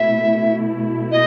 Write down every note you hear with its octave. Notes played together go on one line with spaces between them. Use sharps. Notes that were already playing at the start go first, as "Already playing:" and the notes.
Already playing: B2 A3 E4 E5
D#5